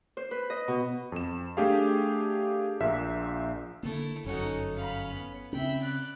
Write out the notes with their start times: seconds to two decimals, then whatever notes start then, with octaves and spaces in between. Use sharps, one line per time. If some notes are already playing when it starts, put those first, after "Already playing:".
0.17 C5
0.31 B4
0.50 D#5
0.68 B2
1.12 F2 E7
1.57 A3 D4 G4 G#4 F5
2.80 A#1 A#2 E5 B6
3.83 D3 A3 A#3 E4
4.25 G1 F#2 C#4 D#4 F#4 A4
4.75 C#4 F5 B5
5.13 B3
5.53 C#3 C4 C#4 E5 G5 B5
5.83 D5 F#6